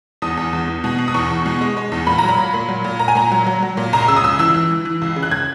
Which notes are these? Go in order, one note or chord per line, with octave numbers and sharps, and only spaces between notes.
E2 D#6
E2
E2
E2
B2
B2
D#6
E2 C#6
E2
B2
G#3
G#3
E2
A#2 B5
F#3 A#5
B5
A#2
A#2
F#3
A#2
A#2 A#5
G#5
A#2 A#5
F#3
F#3
F#3
A#2
C#2 A#5
C#3 E6
D#6
C#2 E6
E3 E6
E3
E3
E3
C#2
C#3
F#6
G#6